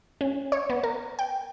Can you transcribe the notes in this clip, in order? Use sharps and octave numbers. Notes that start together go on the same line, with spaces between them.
C#4
C#5
B3
A#4
G5